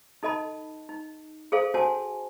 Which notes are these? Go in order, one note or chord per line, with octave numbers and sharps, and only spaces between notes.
D#4 A4 D#5 A5 B5
D#4
G#4 A4 C5 F5
C#4 F#4 C5 G#5 A5